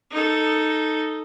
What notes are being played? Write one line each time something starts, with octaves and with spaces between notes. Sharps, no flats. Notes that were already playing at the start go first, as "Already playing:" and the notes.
D#4 A4